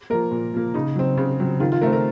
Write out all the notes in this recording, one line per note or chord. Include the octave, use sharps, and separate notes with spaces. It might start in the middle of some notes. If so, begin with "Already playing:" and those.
F3 A#3 A#4
A#2
F3 A#3
C#3 D#4
F#3 C4
C#3
F#3 C4
D#3 F4
F4
A3 C4 A#4
A#4